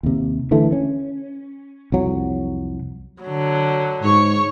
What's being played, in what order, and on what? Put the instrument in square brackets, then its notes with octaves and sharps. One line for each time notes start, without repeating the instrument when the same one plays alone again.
[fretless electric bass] D#2 C3
D3 E3 A3
C#4
C2 F2 F#3
[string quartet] D3 F#3
[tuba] G#2 [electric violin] C#5 C#6